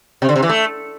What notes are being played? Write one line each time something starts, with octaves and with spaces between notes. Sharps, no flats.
C3
D3
C3
E3
A3